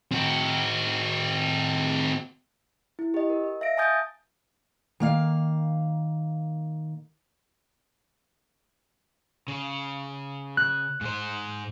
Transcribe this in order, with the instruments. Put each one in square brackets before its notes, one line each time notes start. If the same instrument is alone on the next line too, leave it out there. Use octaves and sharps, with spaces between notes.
[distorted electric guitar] C4 F#4
[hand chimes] E4
G4 D#5
A#4
D#5
E5 F5 A#6 D7
G#5 A5 D#6 G6 A6
[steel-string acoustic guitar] D#3 A#3 F5
[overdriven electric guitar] C#3
[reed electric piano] F#6
[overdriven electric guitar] G#2 C5